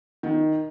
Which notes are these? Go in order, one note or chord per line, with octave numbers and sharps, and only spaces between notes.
D#3